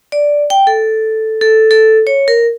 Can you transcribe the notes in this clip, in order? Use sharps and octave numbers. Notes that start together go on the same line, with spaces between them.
D5
G5
A4
A4
A4
C#5
A#4